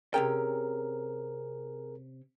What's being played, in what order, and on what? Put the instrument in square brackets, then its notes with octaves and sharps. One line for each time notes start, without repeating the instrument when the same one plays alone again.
[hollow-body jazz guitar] C3 C#4 G5 [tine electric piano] G#4 A#4